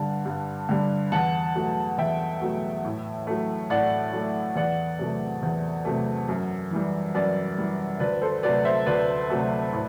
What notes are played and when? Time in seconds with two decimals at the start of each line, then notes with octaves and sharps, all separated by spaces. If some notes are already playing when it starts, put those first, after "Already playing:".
Already playing: G2 D3 G3 F#5 A5
0.25 G2
0.69 D3 G3
1.12 E2 F#5 A5
1.55 B2 F#3 A3
1.98 E2 E5 G5
2.41 B2 F#3 A3
2.85 A2
3.27 F#3 A3
3.70 A2 D5 F#5
4.13 F#3 A3
4.56 E2 D5 F#5
4.99 C3 F#3 A3
5.43 E2
5.85 C3 F#3 A3
6.29 F#2
6.71 E3 G3
7.14 F#2 B4 D5
7.58 E3 G3
8.00 D2 B4 D5
8.22 A4 C5
8.43 C3 F#3 A3 B4 D5
8.65 C5 E5
8.86 D2 B4 D5
9.30 C3 F#3 A3
9.73 A2